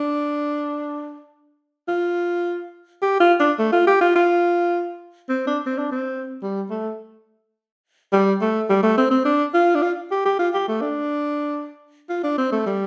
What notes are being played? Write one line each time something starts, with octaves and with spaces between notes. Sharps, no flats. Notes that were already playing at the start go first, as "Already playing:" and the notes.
Already playing: D4
F4
G4
F4
D4
A3
F4
G4
F4
F4
C4
D4
C4
D4
C4
G3
A3
G3
A3
G3
A3
C4
C4
D4
F4
D4
F4
G4
G4
F4
G4
A3
D4
F4
D4
C4
A3
G3